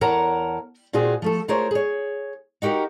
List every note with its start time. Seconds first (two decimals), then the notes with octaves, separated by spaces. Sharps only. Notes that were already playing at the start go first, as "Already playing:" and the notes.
0.01 E2 A#4 C#5 F#5 A5 A#5
0.93 A#2 C4 F4 F#4 G#4
1.22 F3 A3 A4
1.48 A3 F4 G#4 A#4 C5 C#5
1.71 G#4 C#5
2.62 D#4 F#4 G4 A#4 F5